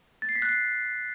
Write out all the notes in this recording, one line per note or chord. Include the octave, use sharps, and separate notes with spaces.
A6
C7
B6
F#6
C7